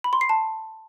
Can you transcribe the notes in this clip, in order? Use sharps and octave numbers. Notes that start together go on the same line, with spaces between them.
B5
C6
C7
A5